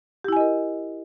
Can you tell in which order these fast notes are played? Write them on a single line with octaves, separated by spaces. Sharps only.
G4 E4 G#5 D#5 A#4